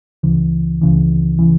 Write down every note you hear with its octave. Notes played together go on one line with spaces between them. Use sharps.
C#2 C#3 E3
C#2 C#3 E3
C#3 E3